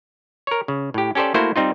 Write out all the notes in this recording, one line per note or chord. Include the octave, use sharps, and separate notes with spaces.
A#4 C#5
C#3
A2 G4
C#4 G4 A4 C5 D5
A3 A#3 E4 F#4 C5
G3 C4 D#4 F4